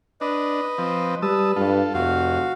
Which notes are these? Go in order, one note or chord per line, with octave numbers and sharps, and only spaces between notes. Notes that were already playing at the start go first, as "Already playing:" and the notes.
D4 B4 D#5
F3 C4
G3 B4 A5 D#6 E6
G2 F4 A4
F1 F2 F#4 F5